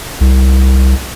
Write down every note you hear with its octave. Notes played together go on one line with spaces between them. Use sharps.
C2